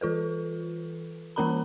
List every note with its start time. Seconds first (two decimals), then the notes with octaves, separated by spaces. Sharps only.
0.01 E3 F4 A4 B4
1.36 E3 A#3 C#4 A#4 A#5 B5